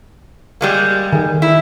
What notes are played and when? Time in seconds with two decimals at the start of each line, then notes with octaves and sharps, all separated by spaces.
0.61 G3 G#3 A#3
1.13 D#3
1.42 E4